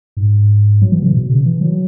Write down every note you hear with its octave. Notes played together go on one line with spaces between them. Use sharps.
G#2
F#3
E3
C#3
B2
C#3
E3
F#3